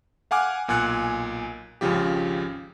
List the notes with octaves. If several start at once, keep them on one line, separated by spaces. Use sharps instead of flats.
F5 F#5 G#5 D6 F6 F#6
B1 A#2 G#5 F#6 C#7
G#1 C#2 C#3 F3 G4